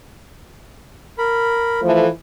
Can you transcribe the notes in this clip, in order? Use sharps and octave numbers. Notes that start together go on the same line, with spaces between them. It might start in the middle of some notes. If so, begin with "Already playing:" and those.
A#4 B5
E3 F3 A3